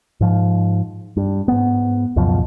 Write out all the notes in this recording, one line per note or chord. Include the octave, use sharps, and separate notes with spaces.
G#2 F3
G2
G#2 B3
C#2 F#2 B2 F3